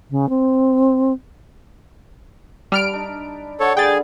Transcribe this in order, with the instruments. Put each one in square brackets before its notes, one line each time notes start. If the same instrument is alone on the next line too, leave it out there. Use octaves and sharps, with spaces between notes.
[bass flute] C#3
C4
[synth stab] G3 F6 D7 [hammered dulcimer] A5 B5
[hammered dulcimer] D4 D#4
[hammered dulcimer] D3 F#4 C5 [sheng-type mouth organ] A4 C#5
[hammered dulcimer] G3 [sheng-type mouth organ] G#4 [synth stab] G5 A6